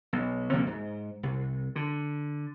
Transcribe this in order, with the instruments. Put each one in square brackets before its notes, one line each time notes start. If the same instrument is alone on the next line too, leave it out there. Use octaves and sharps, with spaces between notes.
[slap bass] B1
D2 C3 F3 A#3
G#2
C2
D3